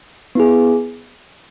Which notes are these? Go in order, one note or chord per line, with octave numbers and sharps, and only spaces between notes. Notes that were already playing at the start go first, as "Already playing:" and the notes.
B3 E4 G#4